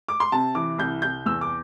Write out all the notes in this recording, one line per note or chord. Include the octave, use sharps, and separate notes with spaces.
D6
C6
C3 A5
E3 D6
C2 G6
C2 G6
E2 E6
D6